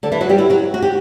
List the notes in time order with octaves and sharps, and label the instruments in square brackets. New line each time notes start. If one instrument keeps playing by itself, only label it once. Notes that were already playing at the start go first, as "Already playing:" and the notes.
[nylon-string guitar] D3 D4
E3 E4
F#3 F#4
G3 G4
E3 E4
F#3 F#4
F#4
G4